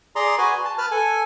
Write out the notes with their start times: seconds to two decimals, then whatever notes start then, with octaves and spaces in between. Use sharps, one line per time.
0.16 G#4 D5 A#5 C6
0.38 F#4 B4 G#5
0.65 A5
0.78 B4 A5 F6
0.91 A4 G#5